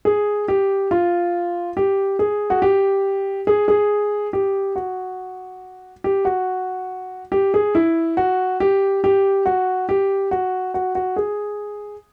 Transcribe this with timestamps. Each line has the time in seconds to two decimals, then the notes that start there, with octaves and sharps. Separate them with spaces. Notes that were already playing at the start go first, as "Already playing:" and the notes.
0.05 G#4
0.48 G4
0.91 F4
1.77 G4
2.19 G#4
2.50 F#4
2.62 G4
3.47 G#4
3.68 G#4
4.33 G4
4.76 F#4
6.04 G4
6.25 F#4
7.32 G4
7.54 G#4
7.75 E4
8.17 F#4
8.60 G4
9.04 G4
9.46 F#4
9.89 G4
10.31 F#4
10.74 F#4
10.95 F#4
11.16 G#4